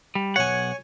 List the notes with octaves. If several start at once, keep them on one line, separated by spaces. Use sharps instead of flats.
G3
B1 C#5 F#5 G#5